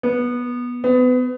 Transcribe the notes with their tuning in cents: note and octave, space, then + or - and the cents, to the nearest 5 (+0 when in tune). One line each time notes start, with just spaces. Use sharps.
B3 -15
B3 +30